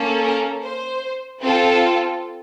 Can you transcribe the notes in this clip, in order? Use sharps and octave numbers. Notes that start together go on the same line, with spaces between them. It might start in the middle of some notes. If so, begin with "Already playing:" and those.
Already playing: A#3 C#4 A4
A#4
C5
C4 F4 A4